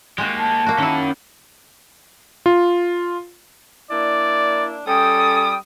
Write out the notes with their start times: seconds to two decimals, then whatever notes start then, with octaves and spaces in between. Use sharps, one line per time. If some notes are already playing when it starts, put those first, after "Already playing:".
0.18 G#3 A#3 F#4 G4
0.38 A5
0.66 A#3 F#4
0.78 D#3 C#4 E4 F#5
2.46 F4
3.91 A#3 D4 E4 D5
4.87 G3 C#4 A4 G5 D#6